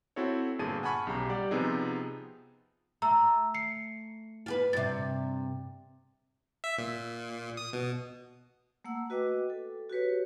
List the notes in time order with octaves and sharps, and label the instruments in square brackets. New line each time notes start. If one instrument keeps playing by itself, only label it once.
[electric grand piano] C4 E4 F#4 A4 C#5
G1 A#2 F4 G#4 A5 D#7
F#5 G#5 A5 B5 C#6 F6
B1 C#3 G4 A#5
G3 G4 D5 F#5
C3 F3 B3 C4 D#4 G#4
[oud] A3 [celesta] A#5 E6
[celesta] C7 C#7
[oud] F4 G4 B4
[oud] G2 C3 [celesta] A6
[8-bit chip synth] E5
A#2
D#6
B2
[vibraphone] A3 A#3 F#5 E6
F#4 B4 D#5 G5 D6
A4
F#4 G4 B4 C#5